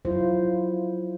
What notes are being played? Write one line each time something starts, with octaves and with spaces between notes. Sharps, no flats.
F#3 E4 F4 C5